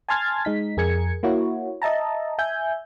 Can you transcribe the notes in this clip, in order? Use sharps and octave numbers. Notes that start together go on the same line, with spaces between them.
G#5 A5 C6 F6 G#6 A6
G#3 D#4 B6
F2 G#4 A#4 G#6 C#7
A#3 E4 F#4 C#5
D#5 E5 A5 A#5
E5 G#5 G6